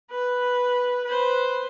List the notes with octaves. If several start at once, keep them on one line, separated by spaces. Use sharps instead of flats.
B4
B4 C5